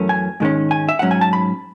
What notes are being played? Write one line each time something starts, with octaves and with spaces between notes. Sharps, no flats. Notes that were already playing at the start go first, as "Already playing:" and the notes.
Already playing: F#2 E3 A3 C#4
G#5
G#2 D#3 G#3 C#4
G#5
E5
G#2 F#3 C#4 F#5
G#5
A5
B5